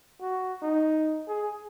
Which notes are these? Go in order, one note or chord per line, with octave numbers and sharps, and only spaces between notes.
F#4
D#4
G#4